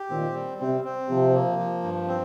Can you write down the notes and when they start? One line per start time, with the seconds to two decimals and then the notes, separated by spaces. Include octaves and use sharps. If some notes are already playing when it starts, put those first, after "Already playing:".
Already playing: G4
0.10 A#2 D#3 C4
0.35 G3
0.60 C3 C4
0.84 C4
1.09 C3 F3
1.34 A#3
1.59 F3
1.83 G2
2.08 C4